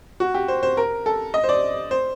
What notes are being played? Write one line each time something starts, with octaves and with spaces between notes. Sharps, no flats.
F#4
G4
C5
C5
A#4
A4
D#5
C5
D5
C5